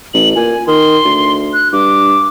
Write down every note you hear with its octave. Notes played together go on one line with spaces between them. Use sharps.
A1 F#7
A#2 G#5
D#3 C6
D2
F#6
G2 D6